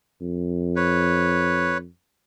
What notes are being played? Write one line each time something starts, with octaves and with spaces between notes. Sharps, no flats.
F2
B4 C#5